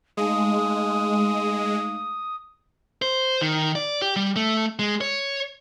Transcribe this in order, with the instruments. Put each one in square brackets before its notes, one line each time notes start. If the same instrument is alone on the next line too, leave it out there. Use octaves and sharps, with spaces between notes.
[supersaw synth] G#3 [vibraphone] A3 D#4 F5 [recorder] D#6
[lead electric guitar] C5
D#3
D5
G4
G3
A3
G#3
C#5